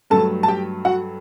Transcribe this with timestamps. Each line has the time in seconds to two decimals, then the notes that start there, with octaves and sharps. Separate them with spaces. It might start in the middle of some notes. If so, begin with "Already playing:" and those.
0.10 G2 F#3 A3 A4 A5
0.43 A5
0.48 G4 G5
0.85 F#4 F#5